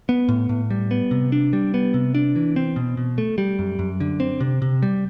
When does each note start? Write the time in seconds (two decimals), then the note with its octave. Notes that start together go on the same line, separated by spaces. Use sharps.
0.09 B3
0.29 A2
0.49 A2
0.70 G3
0.91 B3
1.11 C3
1.32 D4
1.53 G3
1.74 B3
1.94 C3
2.15 D4
2.36 E3
2.56 C4
2.76 B2
2.97 B2
3.18 A3
3.38 G3
3.59 F#2
3.79 F#2
4.00 D3
4.20 C4
4.40 C3
4.62 C3
4.82 G3